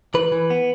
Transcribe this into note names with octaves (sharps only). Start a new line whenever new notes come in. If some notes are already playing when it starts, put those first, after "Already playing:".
E3 B4
E3
B3